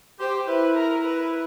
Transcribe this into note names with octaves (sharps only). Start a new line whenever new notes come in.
G4 C5
E4 B4
A#4
B4